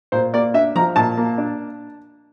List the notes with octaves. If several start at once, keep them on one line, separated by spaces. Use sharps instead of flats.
A#2 C5
A#3 D5
D4 E5
F3 A#5
A#2 A5
A#3
D4